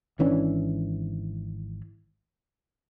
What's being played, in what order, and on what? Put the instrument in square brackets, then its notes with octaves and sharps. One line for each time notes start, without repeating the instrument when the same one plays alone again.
[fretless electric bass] G#1 E3 C#4 D4